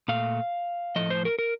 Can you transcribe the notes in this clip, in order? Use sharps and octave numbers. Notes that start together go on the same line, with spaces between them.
A#2 A3 F5
A2 F3 A3 D#5
C5
A#4
A#4